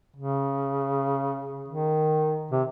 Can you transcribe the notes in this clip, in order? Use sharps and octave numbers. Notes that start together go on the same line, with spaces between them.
C#3
D#3
C3